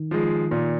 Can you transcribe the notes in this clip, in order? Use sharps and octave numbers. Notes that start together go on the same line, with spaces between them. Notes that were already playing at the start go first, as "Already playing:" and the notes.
Already playing: D#3
F3 G#3
A#2